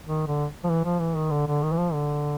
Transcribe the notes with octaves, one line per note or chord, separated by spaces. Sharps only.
D#3
D3
F3
E3
F3
E3
D#3
D3
D3
D#3
E3
F3
D3